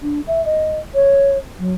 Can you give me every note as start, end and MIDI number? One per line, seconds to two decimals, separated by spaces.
0.01 0.20 62
0.27 0.44 76
0.45 0.79 75
0.94 1.37 73
1.59 1.74 54